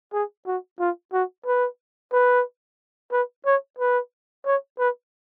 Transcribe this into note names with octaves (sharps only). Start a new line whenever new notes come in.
G#4
F#4
F4
F#4
B4
B4
B4
C#5
B4
C#5
B4